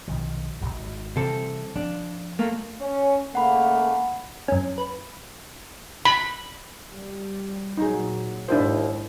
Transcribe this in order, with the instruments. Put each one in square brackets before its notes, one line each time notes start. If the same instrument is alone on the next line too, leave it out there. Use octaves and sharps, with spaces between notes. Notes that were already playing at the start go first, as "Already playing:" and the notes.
[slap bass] B1 D#3 F3
D1 G#1
[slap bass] C3 E3 G3 [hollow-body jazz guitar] C4 A4
[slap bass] F3 [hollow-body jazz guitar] D4
[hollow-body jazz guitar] A3 A#3
[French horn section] C#4 C#5
[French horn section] C#3 A3 A#3 [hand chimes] F#5 B5
[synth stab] F#2 C#4
B4
[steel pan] B5
[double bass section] G3
[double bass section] A#2 F#3 [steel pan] D#4 G#4
[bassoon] D#2 [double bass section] G#2 [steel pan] D4 E4 C5